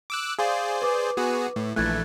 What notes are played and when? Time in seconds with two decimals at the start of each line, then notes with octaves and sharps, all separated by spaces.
0.10 D6 E6 F#6
0.39 G#4 C5 D5 F5
0.82 B4 D6
1.17 B3 F#4 G#4
1.56 A2
1.76 A#1 E3 A3 F#6 G#6 A6